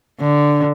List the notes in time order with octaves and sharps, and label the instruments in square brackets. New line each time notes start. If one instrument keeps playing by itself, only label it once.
[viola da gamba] D3